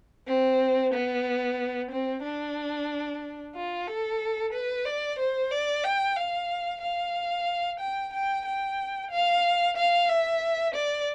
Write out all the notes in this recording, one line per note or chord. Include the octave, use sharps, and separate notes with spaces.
C4
B3
C4
D4
F4
A4
B4
D5
C5
D5
G5
F5
F5
G5
G5
G5
F5
F5
E5
D5